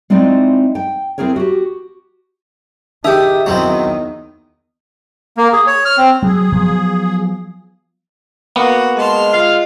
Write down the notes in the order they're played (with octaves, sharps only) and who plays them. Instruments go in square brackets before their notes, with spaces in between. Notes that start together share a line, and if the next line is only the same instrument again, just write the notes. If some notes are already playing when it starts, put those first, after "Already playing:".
[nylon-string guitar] G#3 C4 D#4 E4 D5 D#5
G5
C4 E4 G#4 A#4 C#5
F#4 G4
[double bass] D#3 [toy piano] D#4 G#4 [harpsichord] G4 D#6 [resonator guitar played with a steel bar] E5
[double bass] E2 D#3 [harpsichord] F#3 B3 C4
[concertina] A#3
G#4
C#5
F6
C4
[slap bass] F#3 [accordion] G#4
[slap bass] F3 F#3 B3
[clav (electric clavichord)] A#3 B3 [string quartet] F#4
[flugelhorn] G#3 [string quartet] A5 C6 F6
[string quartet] F4 [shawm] F5